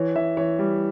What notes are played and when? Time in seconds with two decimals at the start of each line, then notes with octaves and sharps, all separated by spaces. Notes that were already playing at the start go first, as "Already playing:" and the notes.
Already playing: E3 C#5
0.16 E3 E5
0.37 E3 C#5
0.59 G3